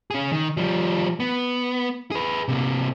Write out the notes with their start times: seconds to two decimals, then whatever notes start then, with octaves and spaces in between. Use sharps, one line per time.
0.11 C#4 G#4
0.32 D#3
0.57 F3 G3
1.20 B3
2.11 G#4 B4
2.48 C3 A#3